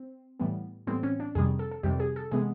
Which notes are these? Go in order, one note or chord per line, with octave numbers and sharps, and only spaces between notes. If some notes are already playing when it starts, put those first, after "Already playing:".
Already playing: C4
A2 E3 G3 B3
A2 E3 G3 B3 C4
C#4
D4
F2 C3 D#3 G3 G#4
A4
A4
F2 C3 D#3 G3 G4
G#4
A4
C3 E3 G#3 B3 G#4